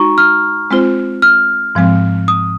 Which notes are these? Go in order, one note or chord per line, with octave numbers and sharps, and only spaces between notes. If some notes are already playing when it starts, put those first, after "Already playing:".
Already playing: G#3 D#4 F#4 A#5 C#6
F6
G#3 C4 F4 C5
F6
G#2 F3 G#3 C4
D#6